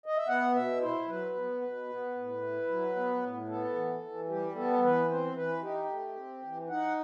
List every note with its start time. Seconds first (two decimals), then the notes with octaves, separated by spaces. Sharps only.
0.06 D#5
0.17 E5
0.28 B3 F#5
0.55 B2 E5
0.81 E4 C5
1.08 F#3 B4
1.35 B3
1.61 B2
1.88 B3
2.15 A2
2.42 E4
2.68 F#3
2.96 B3
3.22 A2
3.48 B3 A4
3.75 E3
4.02 E3
4.29 G3 G4
4.56 B3 A4
4.82 E3 B4
5.09 C4 C5
5.36 E3 B4
5.62 D#4 G4
5.89 A3
6.16 C4
6.43 E3
6.69 D#4 F#5